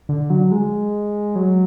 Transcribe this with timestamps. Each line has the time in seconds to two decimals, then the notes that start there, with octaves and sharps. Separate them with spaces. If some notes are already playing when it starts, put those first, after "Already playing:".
0.09 D3
0.30 F#3
0.51 G#3
1.35 F#3